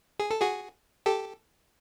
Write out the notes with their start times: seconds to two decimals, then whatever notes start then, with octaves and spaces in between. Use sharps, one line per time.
0.19 G#4
0.31 A4
0.41 F#4 G#4
1.06 G4 A4